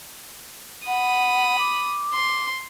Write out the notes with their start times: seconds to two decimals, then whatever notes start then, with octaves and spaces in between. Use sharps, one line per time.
0.87 F#5 B5 D#6
1.59 D6
2.14 C6